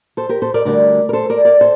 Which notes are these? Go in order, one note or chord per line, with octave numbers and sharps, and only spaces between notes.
A4 C5
G4 A#4
A4 C5
A#4 D5
D2 D3 G3 A#4 D5
A#4
A4 C5
A#4 D5
A#4 D5
A4 C5